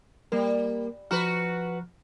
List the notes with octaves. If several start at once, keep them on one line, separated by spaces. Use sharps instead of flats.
G3 A#3 A#4
F3 F#4 B4 A#5 F6